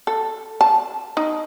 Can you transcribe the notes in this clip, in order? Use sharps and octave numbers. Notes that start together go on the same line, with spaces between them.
A4
A5
D#4